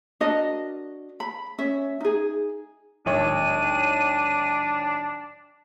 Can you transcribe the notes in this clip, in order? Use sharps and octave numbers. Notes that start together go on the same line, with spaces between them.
D4 F#4 A#4 D#5
B5
C#4 E5
D#4 G#4
D1 G#1 D4 C#5 D#7